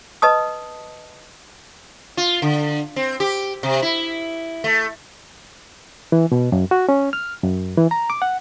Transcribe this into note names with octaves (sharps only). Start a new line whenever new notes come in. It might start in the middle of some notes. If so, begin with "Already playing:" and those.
B4 D#5 A5 D#6
F4
D3
C4
G4
C3
E4
A3
E3
B2
F#2
F#4
C#4
F6
F#2
E3
A#5
D6
F#5